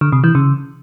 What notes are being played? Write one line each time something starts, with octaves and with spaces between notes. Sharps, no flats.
D3
C3
E3
C#3